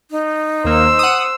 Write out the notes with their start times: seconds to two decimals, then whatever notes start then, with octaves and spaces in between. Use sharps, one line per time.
0.11 D#4
0.65 D#2 A#3 C5 E6
0.99 F#5 D#6